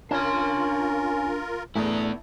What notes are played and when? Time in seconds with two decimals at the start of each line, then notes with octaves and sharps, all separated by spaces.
0.11 C#4 D4 F4 A#4 C6
1.76 A2 A3 B3 D4 E4 G#4 A#5 D#6